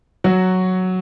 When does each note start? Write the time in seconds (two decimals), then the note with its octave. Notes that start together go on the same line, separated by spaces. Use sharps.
0.24 F#3 F#4